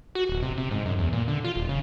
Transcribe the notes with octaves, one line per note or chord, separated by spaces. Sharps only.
F#4
D1
C3
C3
G#2
F#2
E2
A#2
D3
F4
D#1
C#3